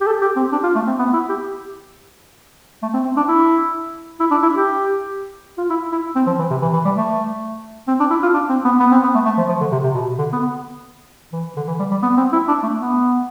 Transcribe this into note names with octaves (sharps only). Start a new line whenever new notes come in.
G4
A4
G4
C4
D4
F4
A3
C4
B3
E4
G4
A3
C4
C4
D4
E4
E4
D4
E4
G4
F4
E4
E4
C4
F3
E3
C3
E3
E3
G3
A3
C4
D4
E4
F4
D4
C4
B3
B3
C4
B3
A3
A3
F3
F3
D3
C3
C3
B2
D3
B3
E3
D3
E3
G3
G3
B3
C4
E4
D4
A3
B3